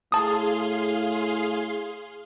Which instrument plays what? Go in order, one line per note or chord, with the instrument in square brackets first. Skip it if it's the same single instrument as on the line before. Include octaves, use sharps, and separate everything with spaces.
[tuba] A2 [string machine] G#4 F5 C6 [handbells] A5 D#6